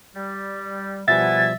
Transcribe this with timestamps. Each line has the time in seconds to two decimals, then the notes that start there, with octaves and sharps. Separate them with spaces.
0.15 G3
1.08 B2 F3 G3 B3 E5 F#5 G#5 A6